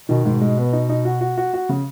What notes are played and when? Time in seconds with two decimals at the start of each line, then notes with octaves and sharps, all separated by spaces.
0.09 B2 D#3
0.25 G#2 B2
0.41 G#3
0.58 B3
0.73 D#4
0.89 D#4
1.05 F#4
1.21 F#4
1.37 F#4
1.53 F#4
1.69 C#3